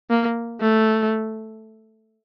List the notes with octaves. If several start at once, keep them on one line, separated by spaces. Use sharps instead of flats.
A#3
A3